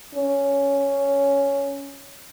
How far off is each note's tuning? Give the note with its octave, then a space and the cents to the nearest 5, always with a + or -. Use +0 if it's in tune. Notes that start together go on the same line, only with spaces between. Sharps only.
C#4 +5